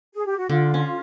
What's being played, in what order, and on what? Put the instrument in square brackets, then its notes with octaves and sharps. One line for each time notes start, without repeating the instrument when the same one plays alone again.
[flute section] G#4
G4
F#4
[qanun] D3 [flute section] F4
[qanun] C#4